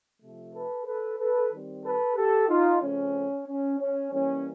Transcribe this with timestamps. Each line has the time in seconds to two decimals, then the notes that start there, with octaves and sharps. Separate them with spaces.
0.21 C3 F3 A3
0.54 A4 B4
0.86 A4 B4
1.18 A4 B4
1.52 D#3 G3 C4
1.84 A4 B4
2.16 G4 A4
2.49 D#4 F4
2.81 C#3 F3 A3 C4 C#4
3.47 C#4
3.79 C#4
4.12 E3 G3 A#3 C#4